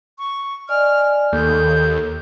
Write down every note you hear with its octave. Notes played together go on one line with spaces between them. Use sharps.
C#6
D5 D#5 G#5 F6
D#2 A4 G6